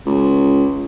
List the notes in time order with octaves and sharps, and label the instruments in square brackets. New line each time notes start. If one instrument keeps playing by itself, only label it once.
[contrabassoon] C#2